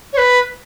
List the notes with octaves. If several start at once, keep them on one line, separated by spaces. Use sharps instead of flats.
C#5
B4